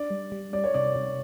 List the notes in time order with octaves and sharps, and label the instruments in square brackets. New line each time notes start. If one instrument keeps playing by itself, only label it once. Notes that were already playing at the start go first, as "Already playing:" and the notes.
Already playing: [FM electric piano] D4 [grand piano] D5
[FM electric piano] G3
G3
[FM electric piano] G3 [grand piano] D5
[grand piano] C#5
[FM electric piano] C3 [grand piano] D5
[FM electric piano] C3